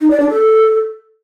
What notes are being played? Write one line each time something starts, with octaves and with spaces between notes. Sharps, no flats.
D#4
D5
D4
A4